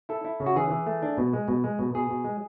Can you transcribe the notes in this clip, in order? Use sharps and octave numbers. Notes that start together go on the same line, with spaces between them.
E4 A4
E4
C#3
F#4
E3 G#4
E3
A3
D4
B2
G#3
B2
G#3
B2
B2 G#4
B2
G#3